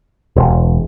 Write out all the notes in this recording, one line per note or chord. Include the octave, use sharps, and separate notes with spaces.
E1